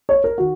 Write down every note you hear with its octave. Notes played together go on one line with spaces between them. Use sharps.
C#5
A#4
D#3 F#4